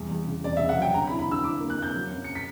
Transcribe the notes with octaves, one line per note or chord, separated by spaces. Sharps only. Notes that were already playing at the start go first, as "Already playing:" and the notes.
Already playing: E2 G3
E2
C#3
E2 D5
E5
C#3
F#5
F#3 G5
D3 A#5
B5
E4
B5
D3 E6
E4 D6
A#3
F#6
A#3 G6
F#3
F#2
C#7
B6